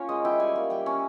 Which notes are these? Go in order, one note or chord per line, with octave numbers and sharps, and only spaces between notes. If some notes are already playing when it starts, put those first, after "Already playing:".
Already playing: A#3 C#4 F4 C#5
G#3 D#5
E4 G5
G3 G#5
A#3
G3 G5
C#4